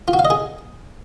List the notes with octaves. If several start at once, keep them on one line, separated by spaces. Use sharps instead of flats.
F4
F#4
F5
D#5
G#4